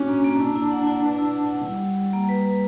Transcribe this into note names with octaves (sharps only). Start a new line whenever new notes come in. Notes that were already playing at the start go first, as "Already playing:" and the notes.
Already playing: C#4 D4 F#4
A#3
A#3
D4 E4
E4
F#5
E4
B4
E4
F#5
F#5
G3 E4
E4
E4
A#3
B4
B4